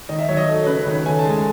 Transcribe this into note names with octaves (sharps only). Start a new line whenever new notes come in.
D#3 D#5
E5
F#3 C#5
D#5
A3 C#5
C#3 B4
B4
D#3 C#5
A3 G#5
A5
G#3
G#5